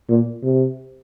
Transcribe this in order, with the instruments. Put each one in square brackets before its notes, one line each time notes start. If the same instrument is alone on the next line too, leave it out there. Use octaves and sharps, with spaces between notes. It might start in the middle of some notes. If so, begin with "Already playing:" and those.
[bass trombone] A#2
C3